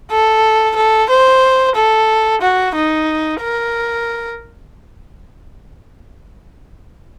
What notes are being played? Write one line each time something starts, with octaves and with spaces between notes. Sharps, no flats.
A4
A4
C5
A4
F#4
D#4
A#4